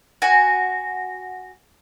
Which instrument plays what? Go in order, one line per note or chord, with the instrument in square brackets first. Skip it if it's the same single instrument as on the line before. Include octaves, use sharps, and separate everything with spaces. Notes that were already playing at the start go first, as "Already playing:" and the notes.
[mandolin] F#4 G#5